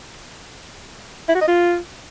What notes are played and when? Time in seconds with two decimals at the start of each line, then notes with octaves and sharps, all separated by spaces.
1.29 E4
1.35 F#4
1.41 D#5
1.48 F4